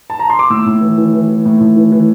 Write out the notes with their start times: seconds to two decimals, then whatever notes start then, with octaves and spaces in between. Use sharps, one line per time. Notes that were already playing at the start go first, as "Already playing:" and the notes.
0.10 A5
0.19 A#5
0.30 C6
0.39 D6
0.50 A2 E6
0.66 A2
0.81 E3
0.98 E3
1.13 E3
1.28 E3
1.45 A2
1.60 A2
1.76 E3
1.92 E3